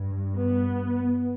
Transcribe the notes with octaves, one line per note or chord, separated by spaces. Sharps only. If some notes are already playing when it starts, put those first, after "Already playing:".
Already playing: G2
B3